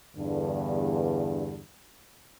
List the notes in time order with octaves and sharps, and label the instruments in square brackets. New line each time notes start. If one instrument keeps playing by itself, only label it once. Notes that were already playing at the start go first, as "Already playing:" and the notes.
[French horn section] E2 G2 D3